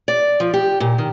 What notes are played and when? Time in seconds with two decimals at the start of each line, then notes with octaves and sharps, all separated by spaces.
0.08 D5
0.40 F3
0.54 G4
0.80 A#2
0.98 D#3